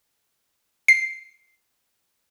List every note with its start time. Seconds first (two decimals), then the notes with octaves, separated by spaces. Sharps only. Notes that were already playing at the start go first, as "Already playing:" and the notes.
0.88 C7